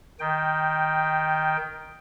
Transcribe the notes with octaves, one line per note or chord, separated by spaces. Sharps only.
D#3 G5